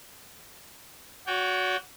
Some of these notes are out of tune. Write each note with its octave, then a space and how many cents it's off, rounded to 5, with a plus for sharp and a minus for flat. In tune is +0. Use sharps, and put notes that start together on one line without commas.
F#4 -5 C#5 +45 G5 +0